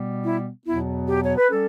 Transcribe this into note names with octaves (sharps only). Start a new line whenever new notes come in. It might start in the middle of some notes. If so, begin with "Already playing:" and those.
Already playing: B2 G3 B3
E4
E2 B2 F#3 B3 E4
G4
C#5
B4
G3 C#4 A4